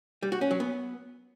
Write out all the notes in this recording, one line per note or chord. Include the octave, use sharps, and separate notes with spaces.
G3
F#4
C#4
F#3
B3